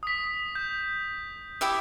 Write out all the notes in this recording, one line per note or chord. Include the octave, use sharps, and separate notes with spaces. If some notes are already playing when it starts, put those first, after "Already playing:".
D#6 B6
G6
E4 G4 E5